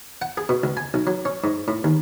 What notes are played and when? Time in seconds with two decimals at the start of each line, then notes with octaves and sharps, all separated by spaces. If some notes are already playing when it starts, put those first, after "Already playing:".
0.22 F#5
0.37 G#4
0.49 B2
0.63 C#2
0.77 G#5
0.94 B1
1.07 F#3
1.25 C#4
1.44 G#2
1.68 A2
1.84 D#2